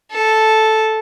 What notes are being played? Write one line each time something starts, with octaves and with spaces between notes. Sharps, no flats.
A4